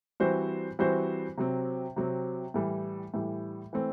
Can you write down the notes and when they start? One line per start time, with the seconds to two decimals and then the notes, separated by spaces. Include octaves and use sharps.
0.20 E3 G3 C4 F#4 C5
0.79 E3 G3 C4 F#4 C5
1.38 C3 F#3 C4
1.96 C3 F#3 C4
2.54 A2 E3 G3
3.14 A2 E3 G3
3.73 E3 A3 C4